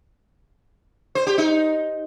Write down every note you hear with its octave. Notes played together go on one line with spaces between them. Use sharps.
C5
G4
D#4